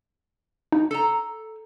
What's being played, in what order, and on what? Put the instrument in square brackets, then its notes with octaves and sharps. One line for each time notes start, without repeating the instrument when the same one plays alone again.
[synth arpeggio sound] D#4
[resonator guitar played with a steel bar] A4 A#5